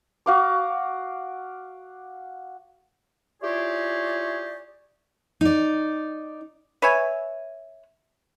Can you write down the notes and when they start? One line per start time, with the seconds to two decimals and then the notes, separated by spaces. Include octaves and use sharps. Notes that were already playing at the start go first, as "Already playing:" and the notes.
0.26 F#4 F5 D6
3.43 E4 F4 G4 G#4 C#5 D5
5.41 D#4 D5
6.82 B4 C#5 E5 G#5